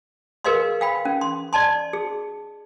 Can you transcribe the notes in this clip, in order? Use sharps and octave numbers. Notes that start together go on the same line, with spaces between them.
G#4 A#4 B4 D#5 F5 C6
F5 G5 B5
C#4
C6
D5 D#5 A5 C6
G#4